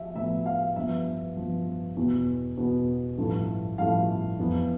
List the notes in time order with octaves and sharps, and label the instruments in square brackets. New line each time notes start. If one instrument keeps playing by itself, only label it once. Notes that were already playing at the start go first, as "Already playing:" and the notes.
Already playing: [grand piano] F3 E5
A2 F3 B3 E5
F5
G2 F3 B3 E5
G2 F3 B3
E2 B2 B3
E2 B2 B3
A1 G2 F3 A3 E4
A1 G2 F3 A3 E4 F5
F2 E3 B3 E4